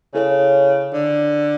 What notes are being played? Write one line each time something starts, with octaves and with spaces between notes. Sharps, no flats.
C#3 E4 A4 C#5
D3